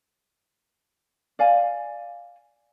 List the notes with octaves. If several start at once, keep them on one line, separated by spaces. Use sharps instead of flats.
D5 F5 G#5